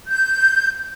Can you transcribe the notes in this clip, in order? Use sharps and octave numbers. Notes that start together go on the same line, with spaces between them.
G6